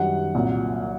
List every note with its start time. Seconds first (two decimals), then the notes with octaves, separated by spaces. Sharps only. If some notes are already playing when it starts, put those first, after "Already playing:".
Already playing: F#2 D#3 G3 F#5
0.35 C2 A#2 F#3